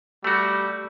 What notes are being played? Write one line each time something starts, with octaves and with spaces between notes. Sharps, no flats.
G3 A3 F#4